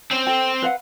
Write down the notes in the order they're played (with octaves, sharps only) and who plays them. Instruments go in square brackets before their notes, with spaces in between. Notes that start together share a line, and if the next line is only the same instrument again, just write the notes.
[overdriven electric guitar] C4 C5 [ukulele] C#4
[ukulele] A4 G5
B4 F5 F#5